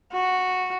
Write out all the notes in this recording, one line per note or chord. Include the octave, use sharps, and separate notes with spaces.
F#4